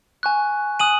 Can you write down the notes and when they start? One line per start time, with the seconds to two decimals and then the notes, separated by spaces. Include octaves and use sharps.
0.23 G#5 C#6 F#6
0.79 G#5 D#6 F#6 D#7 F#7